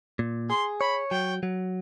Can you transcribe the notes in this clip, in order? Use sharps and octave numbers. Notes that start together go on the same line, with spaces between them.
A#2
G#4 C6
C#5 B5
F#3 G5
F#3